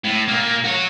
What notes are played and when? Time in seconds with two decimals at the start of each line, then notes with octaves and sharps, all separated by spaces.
0.04 A2
0.28 A#2 A#3
0.64 F#4 C#5